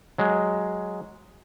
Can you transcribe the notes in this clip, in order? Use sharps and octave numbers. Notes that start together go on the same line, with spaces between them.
F#3 G#3